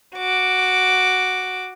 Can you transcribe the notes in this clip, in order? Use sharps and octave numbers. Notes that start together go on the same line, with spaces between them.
F#4 D6